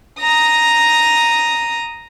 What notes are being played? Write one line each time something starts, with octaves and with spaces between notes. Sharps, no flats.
A#5 D#6